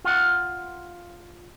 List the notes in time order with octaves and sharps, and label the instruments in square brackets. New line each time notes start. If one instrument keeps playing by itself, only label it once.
[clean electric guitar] F4 F#5